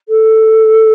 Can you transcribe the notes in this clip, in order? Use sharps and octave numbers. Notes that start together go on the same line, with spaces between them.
A4